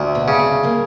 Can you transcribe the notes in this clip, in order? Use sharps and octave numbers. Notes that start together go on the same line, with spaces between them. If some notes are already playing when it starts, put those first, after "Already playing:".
Already playing: D2
B2 B3
C#3
C3 C4
A#2 A#3